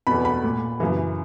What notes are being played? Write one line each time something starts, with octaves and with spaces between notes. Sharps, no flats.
E2 B2 B5
B5
A#2
F#2 C#3 E3